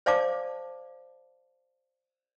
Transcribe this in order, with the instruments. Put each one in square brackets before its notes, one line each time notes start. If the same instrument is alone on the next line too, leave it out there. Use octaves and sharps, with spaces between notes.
[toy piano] C5 D5 F5 A5 D6